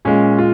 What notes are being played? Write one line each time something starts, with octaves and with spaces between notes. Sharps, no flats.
A#2 G#3 C#4
F4